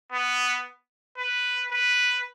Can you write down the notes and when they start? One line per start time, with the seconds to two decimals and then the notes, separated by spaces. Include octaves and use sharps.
0.12 B3
1.18 B4
1.71 B4